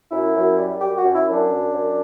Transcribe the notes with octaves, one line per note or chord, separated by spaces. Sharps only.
F#2 E4
F#2
G3
F#2 G4
F#4
F#2
E4
F#2
D4
F#2
F#2